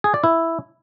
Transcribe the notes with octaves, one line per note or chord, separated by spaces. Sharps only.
G#4
D5
E4